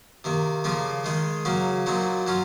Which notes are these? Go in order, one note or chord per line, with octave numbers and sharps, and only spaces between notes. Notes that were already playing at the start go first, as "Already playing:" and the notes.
C3 D#3 A#3
C#3 F3 A#3 F4
D#3 G#3 D#4
C#3 F#3 A#3 C#4
A#2 F#3 C4 D#4
F#3 C#4 F4